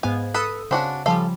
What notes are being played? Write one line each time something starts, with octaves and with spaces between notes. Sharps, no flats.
G#2 B3 F5 G#5
A4 B4 D#6 E6
C#3 C4 D4 F#4
C#3 F3 G3 A4 F5